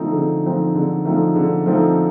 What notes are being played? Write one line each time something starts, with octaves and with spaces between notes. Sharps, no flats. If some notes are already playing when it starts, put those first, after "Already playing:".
Already playing: D3 F3 A3 C4 D#4
D3
F3 A3 C4 D#4
D3
F3 A3 C4 D#4
D3
F3 A3 C4 D#4